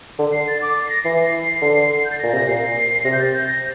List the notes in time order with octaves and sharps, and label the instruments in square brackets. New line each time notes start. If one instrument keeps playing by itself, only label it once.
[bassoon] D3
[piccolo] C7
A6
D6
A6
C7
A#6
[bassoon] E3 [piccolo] C7
[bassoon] D3
[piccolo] G6
A6
[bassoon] A#2 [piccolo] A#6
[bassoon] C3 [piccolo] A#6
[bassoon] A#2 [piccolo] C7
[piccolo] C7
[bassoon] C3 [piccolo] A#6
[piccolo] G6
A6
G6
A#6